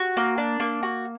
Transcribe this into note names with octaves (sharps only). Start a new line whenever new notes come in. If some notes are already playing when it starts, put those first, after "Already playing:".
Already playing: F#4
A#3
D4
A#3
F#4